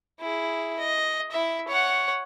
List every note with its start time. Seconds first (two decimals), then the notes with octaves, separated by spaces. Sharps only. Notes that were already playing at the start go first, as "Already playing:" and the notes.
0.21 E4 G#4
0.79 D#5
1.31 E4 E5
1.68 C#5 F#5